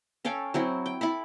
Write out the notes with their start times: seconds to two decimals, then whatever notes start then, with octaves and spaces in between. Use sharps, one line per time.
0.25 C#4 A4 F5 G5
0.54 F#3 C4 E4
0.86 G5
1.01 E4 A4 B5